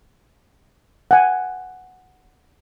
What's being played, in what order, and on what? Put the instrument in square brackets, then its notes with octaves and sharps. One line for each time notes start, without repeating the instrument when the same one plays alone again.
[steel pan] F#5 G#5